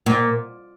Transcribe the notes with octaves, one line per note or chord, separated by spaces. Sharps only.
A#2